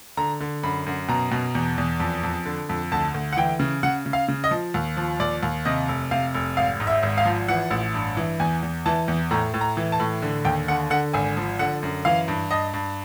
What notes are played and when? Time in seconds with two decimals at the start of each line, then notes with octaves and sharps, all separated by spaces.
0.17 D3 A#5
0.40 D3
0.63 F#2 B5
0.86 F#2
1.08 B2 A#5
1.31 B2
1.55 E2
1.78 E2
2.00 F2
2.23 F2
2.46 D3
2.69 F2
2.92 D2 A5
3.14 D2
3.33 F#5
3.37 E3 G5
3.60 C#3
3.83 C#3 F#5
4.06 C#3
4.13 F5
4.28 C#3
4.44 D#5
4.51 F3
4.74 D#2
4.97 F3
5.20 D#2 D5
5.43 D#2
5.65 C3 D#5
5.89 F1
6.11 C3 F5
6.35 F1
6.57 G#1 F5
6.80 G#2
6.87 E5
7.03 G#1
7.18 F5
7.25 F3
7.48 E3 F#5
7.71 A1
7.94 G2
8.17 E3
8.40 E2 G#5
8.63 E2
8.86 E3 A5
9.08 E2
9.31 A2 A#5
9.54 A2
9.61 A#5
9.77 E3
9.92 A5
10.00 A2
10.22 D3
10.45 D#2 G5
10.68 D3 F#5
10.90 D3 F#5
11.13 G#1 G#5
11.37 F3
11.59 D3 F#5
11.83 F#2
12.05 E3 F5
12.28 G2
12.51 G2 D#5
12.74 G2